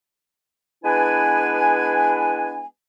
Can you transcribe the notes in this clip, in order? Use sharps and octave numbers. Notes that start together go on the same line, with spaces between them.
G#3 B3 D4 E4 B4 G#5